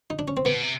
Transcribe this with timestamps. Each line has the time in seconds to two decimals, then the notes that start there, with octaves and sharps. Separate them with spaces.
0.10 D#4
0.19 D4
0.28 C#4
0.37 C4
0.45 C3 B3
0.54 B2
0.63 C3